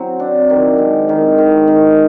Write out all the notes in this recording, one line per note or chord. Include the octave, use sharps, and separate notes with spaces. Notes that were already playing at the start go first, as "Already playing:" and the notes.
Already playing: F#3 C4
D4
D#3
G#3
D#3
D#3
D#3